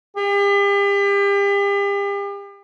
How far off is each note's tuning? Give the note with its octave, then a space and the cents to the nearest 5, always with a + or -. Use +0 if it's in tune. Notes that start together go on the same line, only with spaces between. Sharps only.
G4 +40